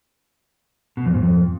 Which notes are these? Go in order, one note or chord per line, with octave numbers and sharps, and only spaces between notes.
B2
F2
G#2
F2